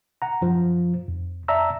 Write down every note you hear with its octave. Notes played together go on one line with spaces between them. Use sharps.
F#5 A#5
F#2 F3
F2
D5 E5 A5 A#5 E6